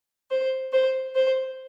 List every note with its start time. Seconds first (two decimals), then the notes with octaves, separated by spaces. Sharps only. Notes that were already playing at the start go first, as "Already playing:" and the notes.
0.30 C5
0.72 C5
1.15 C5